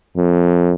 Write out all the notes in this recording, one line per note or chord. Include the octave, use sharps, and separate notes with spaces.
F2